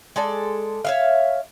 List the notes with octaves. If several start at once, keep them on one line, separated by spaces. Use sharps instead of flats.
G#3 A4 D5
C#5 E5 F5